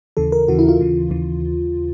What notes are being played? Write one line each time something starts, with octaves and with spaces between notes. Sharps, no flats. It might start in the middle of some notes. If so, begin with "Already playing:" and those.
D#2 C#3 E3 A4
A#4
D#2 C#3 E3 F#4
E4
F4
D#2 C#3 E3
D#2 C#3 E3